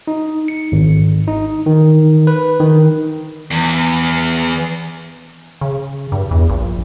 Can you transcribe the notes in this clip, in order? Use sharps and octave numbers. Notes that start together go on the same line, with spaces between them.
D#4
C#7
G#1
D#4
D#3
B4
D#3
E2
C#3
G2
E2
A#1